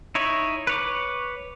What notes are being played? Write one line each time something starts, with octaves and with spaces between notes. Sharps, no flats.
D#4 E4 C#5
B4 C#5 D6